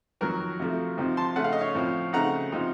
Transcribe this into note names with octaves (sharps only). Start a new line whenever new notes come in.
F2 D#3 F#3 F#4 A#4
C3 F3 A3
C3 F3 C4 D#4
A5 C6
C#3 A3 C#4 F#5
F5
D#5
C#5 F5
A2 F3 C4
C#3 A3 C4 D#4 F#5 A#5
C3 F3 C4 D#4